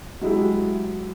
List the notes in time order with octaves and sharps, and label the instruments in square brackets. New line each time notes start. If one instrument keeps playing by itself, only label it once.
[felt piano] F#3 G#3 E4 G4